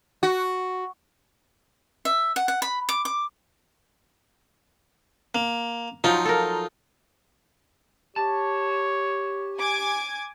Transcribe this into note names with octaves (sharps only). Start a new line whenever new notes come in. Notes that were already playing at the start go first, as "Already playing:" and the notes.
F#4
E5
F#5
F#5
B5
D6
D6
A#3
F3 F#3 D#4 F4
A4 A#4
G4 C#5 A5
G#5 D6 G#6